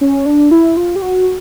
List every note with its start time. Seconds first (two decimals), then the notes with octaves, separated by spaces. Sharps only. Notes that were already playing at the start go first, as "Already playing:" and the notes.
0.01 C#4
0.26 D4
0.51 E4
0.77 F4
0.96 G4
1.02 F#4